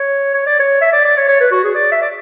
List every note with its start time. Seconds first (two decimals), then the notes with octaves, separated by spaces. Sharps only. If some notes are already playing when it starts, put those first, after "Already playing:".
Already playing: C#5
0.34 C#5
0.46 D5
0.59 C#5
0.81 E5
0.92 D5
1.05 D5
1.17 C#5
1.28 C#5
1.40 B4
1.51 F#4
1.64 G#4
1.75 D5
1.92 E5
2.02 D5